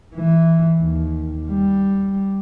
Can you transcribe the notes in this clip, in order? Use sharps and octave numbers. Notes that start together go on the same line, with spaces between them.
E3
D#2
G3